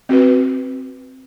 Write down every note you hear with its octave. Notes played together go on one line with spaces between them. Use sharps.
C4 F#4 B4